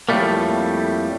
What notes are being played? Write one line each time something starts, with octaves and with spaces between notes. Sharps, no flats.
F2 A2 F#3 G3 A3 A#3